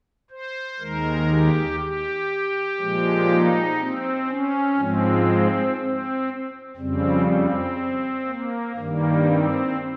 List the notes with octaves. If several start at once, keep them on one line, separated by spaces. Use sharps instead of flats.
C5
D#2 D#3 G#3 A#4
G4
G4
A#2 F3 G#3
D#4
C4
C#4
G#2 F3 G#3 C4
C4
F2 C#3 G3 C4
C4
A#3
G2 D#3 G3 A#3
C4